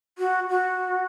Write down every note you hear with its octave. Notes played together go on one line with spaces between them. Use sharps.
F#4
F#4